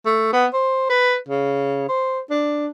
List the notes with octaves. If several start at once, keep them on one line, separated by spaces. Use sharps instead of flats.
A3
B3
C5
B4
C#3
C5
D4